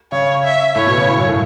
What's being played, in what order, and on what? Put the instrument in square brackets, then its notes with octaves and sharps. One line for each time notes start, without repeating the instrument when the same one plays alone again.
[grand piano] C#3 [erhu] C#5
[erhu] E5
[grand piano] A2 [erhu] C#5
[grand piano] B2
C#3
A2
F#2
A2